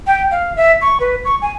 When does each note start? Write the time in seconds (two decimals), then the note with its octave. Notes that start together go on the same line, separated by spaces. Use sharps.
0.07 G5
0.31 F5
0.56 E5
0.82 C#6
1.00 B4
1.25 C#6
1.42 G#5